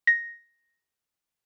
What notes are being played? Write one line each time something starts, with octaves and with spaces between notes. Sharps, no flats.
A#6